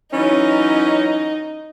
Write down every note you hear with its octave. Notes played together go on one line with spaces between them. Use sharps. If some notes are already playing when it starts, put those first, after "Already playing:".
E3 F#3 C#4 D#4